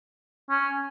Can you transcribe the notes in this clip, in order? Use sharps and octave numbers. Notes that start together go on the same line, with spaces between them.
C#4